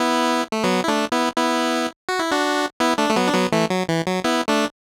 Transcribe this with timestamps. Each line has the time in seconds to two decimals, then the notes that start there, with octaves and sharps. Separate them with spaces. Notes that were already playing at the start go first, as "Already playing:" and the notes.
Already playing: B3 E4
0.52 A3
0.64 F#3 B3
0.84 E4
0.88 A3 D4
1.12 B3 E4
1.36 B3 E4
2.09 F#4
2.19 E4
2.31 D4 F#4
2.80 B3 E4
2.98 A3 D4
3.10 A3
3.16 F#3 B3
3.28 D4
3.34 F#3 B3
3.52 E3 A3
3.70 F#3
3.89 E3
4.07 F#3
4.24 B3 E4
4.48 A3 D4